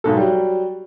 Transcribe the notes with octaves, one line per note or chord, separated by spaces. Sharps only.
B1 G#2 A4
F#3 G3